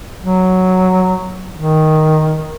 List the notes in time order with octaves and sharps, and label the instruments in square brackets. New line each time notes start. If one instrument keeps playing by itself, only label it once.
[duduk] F#3
D#3